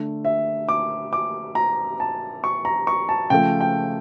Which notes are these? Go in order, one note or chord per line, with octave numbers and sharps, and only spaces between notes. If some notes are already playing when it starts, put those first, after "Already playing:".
Already playing: D3 A3
E5
D6
D6
A#5
A5
C#6
A#5
C#6
A5
C#3 F3 A3 G5
G5